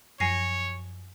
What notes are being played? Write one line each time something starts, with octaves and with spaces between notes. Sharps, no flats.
F#2 F3 C#5 G#5 A#6 C7